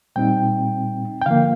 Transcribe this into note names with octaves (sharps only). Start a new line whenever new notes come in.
A#2 G3 C4 D#4 G5
G5
D3 F3 A#3 F5